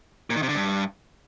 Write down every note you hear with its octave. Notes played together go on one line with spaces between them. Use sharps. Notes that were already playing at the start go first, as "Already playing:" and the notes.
A#2
D#3
C3
D3
G2